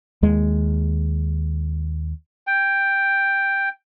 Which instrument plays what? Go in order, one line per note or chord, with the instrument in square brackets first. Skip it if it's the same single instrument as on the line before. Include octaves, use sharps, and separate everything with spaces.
[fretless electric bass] D#2 G#3
[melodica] G5